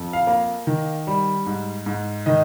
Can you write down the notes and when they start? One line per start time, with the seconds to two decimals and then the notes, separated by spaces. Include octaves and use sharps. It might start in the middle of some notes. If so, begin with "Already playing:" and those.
Already playing: F2
0.13 F5
0.27 A#3
0.67 D#3
1.07 G3
1.47 G#2
1.86 G#2
2.26 D#3 D#5